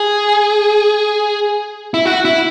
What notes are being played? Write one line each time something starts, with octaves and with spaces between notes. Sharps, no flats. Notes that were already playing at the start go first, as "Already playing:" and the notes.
Already playing: G#4
E4
F#4
E4